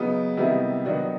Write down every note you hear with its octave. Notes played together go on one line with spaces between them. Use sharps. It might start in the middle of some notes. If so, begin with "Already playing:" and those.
Already playing: C#3 F#3 B3 D#4
C3 D#3 G3 B3 E4
D#3 F#3 B3 D4 F#4